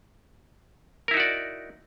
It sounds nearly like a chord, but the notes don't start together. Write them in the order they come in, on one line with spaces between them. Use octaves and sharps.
A#4 E4 D#4 F#4 D5